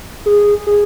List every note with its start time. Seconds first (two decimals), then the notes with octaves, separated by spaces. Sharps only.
0.26 G#4
0.67 G#4